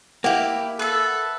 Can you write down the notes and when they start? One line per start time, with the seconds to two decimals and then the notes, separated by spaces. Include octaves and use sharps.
0.24 A#3 E4 G4 F#5
0.79 A4 B4 E5